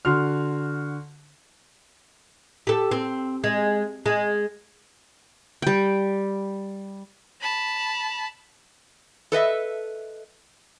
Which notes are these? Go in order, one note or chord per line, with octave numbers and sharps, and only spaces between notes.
D3 F#4 C6 F6
G4 A4
C4
G#3
G#3
G3 G5
A5 B5
A4 B4 D#5 E5